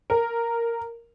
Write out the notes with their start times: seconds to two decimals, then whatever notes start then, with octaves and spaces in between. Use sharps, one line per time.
0.10 A#4